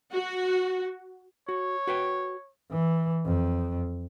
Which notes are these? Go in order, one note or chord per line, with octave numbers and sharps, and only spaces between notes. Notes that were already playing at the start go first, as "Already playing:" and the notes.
F#4
F#4 C#5
F#4 B4 G5
E3
F2